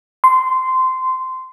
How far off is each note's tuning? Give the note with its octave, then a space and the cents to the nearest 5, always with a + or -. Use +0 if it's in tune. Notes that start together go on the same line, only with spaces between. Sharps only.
C6 -15